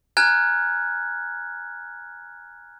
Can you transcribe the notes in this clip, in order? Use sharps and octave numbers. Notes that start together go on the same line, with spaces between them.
G#5 A#5 F6 F#6 G#6